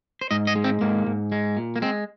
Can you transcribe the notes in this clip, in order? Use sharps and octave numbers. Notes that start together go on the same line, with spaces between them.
C5
G#2 D#5
D#5
G#3
C4
G#2 A#3
G#2
G#3
A#2
A#3
G#3 C4